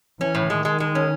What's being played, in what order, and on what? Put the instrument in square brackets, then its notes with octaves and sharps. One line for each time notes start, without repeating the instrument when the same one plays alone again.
[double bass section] E3 [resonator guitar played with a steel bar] C#4
[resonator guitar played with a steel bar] A2
[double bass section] D#3 [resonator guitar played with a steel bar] G#3
[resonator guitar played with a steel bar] G#3
G#3
C#4